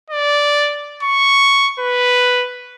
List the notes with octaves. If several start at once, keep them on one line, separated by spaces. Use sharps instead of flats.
D5
C#6
B4